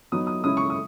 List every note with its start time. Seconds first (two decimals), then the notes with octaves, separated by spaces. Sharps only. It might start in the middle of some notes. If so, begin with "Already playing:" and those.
0.12 F#3 B3 D#4 D#6
0.27 D#6
0.44 C#3 G#3 C#4 E4 D#6
0.57 C#6
0.70 D#6